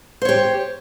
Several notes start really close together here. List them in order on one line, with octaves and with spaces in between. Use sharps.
C5 C#5 G4